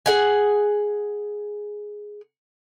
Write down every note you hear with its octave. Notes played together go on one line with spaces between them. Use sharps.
G#4 F#5 G#5